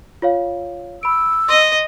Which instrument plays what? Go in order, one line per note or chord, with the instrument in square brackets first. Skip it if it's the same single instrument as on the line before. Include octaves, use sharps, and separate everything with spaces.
[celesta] F4 C#5 F5
[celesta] B5 D7 [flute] E6
[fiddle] D#5 [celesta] C6